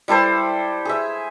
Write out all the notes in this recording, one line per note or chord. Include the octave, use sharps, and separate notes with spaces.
G3 E4 A4 C5
G#4 E5